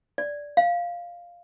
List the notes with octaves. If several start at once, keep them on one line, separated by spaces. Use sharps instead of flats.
D5
F5